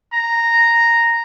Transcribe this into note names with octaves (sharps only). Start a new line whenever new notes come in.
A#5